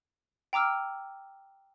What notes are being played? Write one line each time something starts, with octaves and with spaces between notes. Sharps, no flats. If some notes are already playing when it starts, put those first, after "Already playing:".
G5 A#5 D6 E6 F6